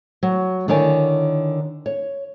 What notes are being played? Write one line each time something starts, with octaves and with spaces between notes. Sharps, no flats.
F#3
D3 D#3 E4 C#5 D5 G#5
C#5